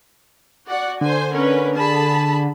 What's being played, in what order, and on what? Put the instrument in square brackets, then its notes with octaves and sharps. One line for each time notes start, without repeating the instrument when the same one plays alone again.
[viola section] F#4 D5 F#5
[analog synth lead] D3 [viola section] C5 G#5
[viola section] C#4 A#4 B4
G#4 A5 B5